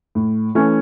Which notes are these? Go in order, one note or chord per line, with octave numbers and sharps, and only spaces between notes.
A2
E3 A3 C#4